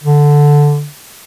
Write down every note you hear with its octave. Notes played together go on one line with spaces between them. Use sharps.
D3